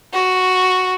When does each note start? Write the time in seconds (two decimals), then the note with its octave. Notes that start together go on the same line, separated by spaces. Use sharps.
0.13 F#4